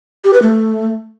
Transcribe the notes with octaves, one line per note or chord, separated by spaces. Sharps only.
G4
B4
A3